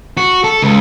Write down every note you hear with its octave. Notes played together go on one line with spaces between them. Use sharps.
F#4
A4
C#2